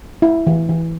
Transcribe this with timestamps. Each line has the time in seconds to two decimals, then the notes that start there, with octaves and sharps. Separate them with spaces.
0.22 E4
0.47 E3
0.69 E3